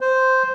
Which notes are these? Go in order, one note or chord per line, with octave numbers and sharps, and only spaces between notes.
C5